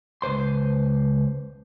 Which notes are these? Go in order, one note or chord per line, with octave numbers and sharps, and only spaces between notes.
C#2 B4 C5 C6